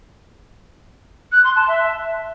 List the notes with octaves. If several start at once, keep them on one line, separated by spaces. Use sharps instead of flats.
F#6
C6
A5
E5